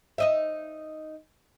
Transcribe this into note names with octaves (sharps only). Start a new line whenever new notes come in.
D#4 D#5 E5